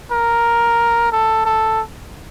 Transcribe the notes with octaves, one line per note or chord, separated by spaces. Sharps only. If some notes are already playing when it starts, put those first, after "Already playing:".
A#4
A4
A4